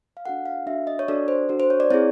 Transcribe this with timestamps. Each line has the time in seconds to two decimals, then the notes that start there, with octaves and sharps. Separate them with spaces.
0.17 F5
0.26 D4 F#4 A4 F#5
0.46 F5
0.67 D4 F#4 A4 E5
0.87 D#5
0.99 C#5
1.08 D4 F#4 A4 D5
1.28 C5
1.49 D4 F#4 A4
1.60 C5
1.70 C#5
1.80 D5
1.90 C4 E4 G#4 C#5